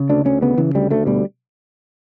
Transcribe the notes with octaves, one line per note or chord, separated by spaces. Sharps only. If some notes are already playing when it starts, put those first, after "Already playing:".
Already playing: C#3
D2 D4
D2 C#4
C#3 B3
C#3 E3
D2 G3
D2 A3
B2 G3